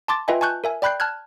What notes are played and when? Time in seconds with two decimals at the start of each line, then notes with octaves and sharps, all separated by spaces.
0.08 A5 C6 D6 A6
0.28 F4 B4 D#5 E5 G5 G#5
0.41 G#5 A5 C#6 F#6 G6
0.64 A#4 E5 G#5
0.82 D5 G5 B5 F#6 G6 C7
1.00 A5 F6 F#6 G#6